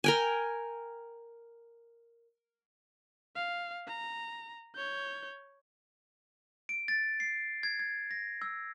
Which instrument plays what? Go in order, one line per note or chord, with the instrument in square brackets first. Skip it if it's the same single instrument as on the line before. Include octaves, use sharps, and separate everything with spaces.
[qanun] A#4 G5 G#5
[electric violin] F5
A#5
C#5 G6
[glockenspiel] D7
A6
C7
G#6
G#6
A#6
E6